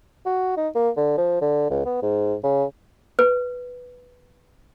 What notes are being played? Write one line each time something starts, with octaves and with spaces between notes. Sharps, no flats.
F#4
D#4
A#3
D3
F3
D3
C#2
B3
G#2
C#3
B4